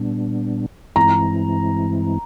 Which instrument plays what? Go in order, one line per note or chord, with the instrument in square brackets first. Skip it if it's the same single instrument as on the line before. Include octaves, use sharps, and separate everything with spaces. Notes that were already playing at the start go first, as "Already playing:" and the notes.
Already playing: [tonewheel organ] A#2 G3 B3 D4
[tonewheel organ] G2 E3 G#3 C4 E4 [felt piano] A#5